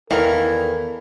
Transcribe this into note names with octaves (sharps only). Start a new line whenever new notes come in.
E2 D#3 E3 A4 A#4 D#5 F5 C#6